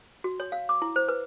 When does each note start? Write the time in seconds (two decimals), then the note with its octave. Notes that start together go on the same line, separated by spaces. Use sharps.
0.24 F#4
0.40 C#5
0.52 F5
0.69 D6
0.82 E4
0.96 C5
1.09 B4